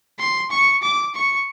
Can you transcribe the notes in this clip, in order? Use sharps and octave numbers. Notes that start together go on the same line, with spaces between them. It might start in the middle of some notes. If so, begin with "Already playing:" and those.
C6
C#6
D6
C#6